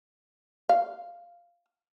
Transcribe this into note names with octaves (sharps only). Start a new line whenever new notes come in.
F5